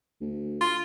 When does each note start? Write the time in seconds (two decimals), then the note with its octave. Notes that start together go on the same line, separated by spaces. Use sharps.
0.21 D2
0.61 F4